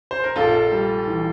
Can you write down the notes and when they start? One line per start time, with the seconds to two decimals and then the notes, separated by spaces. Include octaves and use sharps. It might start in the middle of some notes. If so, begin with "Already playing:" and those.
0.11 C5
0.24 A#4
0.36 A#1 F4 A4
0.72 G3
1.07 E3